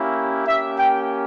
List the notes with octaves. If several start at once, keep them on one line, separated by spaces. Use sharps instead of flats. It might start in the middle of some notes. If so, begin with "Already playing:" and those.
Already playing: A#3 C#4 E4 G4
A#3 C#4 G4 E5
G5